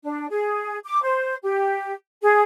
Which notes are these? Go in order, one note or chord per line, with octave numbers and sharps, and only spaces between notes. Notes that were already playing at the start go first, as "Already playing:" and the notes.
D4
G#4
D6
C5
G4
G#4